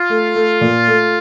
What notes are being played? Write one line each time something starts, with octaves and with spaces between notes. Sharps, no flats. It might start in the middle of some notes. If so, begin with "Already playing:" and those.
Already playing: F4
A3
A3
A#2
A3